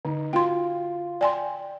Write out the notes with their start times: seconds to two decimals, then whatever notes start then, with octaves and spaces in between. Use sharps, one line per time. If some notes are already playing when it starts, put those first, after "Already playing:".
0.05 D3 D#4
0.33 F4 F#4 G5 C6
1.21 D5 G5 G#5 C6